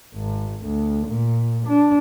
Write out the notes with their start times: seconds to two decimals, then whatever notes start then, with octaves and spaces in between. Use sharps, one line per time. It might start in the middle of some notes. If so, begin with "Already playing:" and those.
0.14 G#1
0.64 D2
1.08 A#2
1.68 D4